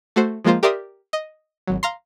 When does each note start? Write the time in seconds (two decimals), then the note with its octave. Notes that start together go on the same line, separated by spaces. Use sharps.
0.16 A3 F#4 C5
0.44 F3 G#3 A#3 F4 C5
0.63 G4 A#4 D5 E5 C6 D#6
1.13 D#5
1.67 G#1 F#3
1.83 F5 A#5 C6